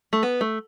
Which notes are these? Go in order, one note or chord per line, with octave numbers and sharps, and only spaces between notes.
A3
B3
A3